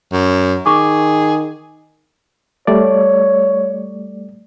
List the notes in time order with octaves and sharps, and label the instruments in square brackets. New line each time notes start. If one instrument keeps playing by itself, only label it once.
[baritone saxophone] F#2
[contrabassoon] D#3 [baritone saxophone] G#4 [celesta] C#6 D6
[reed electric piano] G3 A3 D5 [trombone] C#5